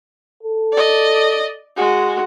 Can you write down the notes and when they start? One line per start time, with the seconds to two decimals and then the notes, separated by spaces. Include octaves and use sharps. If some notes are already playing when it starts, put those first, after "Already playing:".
0.43 A4
0.72 D5 D#5
1.76 G#3 F#4